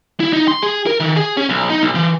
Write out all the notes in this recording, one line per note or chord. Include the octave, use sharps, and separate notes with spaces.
E4
D#4
C6
G#4
A#4
D#3
G#4
C#4
B1
D#4
B1
E3